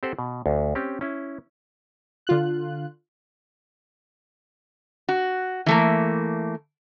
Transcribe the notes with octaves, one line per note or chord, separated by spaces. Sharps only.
C4 G4 A4 C5 F#5
B2
D2
C4 C#4 G4
C#4 E4
D3 F4 F#6
F#4
E3 A3 A#3